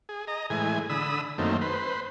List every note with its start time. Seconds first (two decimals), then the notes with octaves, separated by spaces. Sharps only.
0.09 G#4
0.28 D#5 A#5
0.50 A2 E3 G#3 G#5
0.89 D3 B5 D#6 E6
1.38 F#2 D#3 A3 A#3 C4
1.61 B4 C5